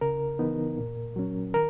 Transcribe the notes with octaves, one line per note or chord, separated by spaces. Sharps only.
C#3 A#4
E3 B3 D#4
A#2
F#3 C#4
D#3 A#4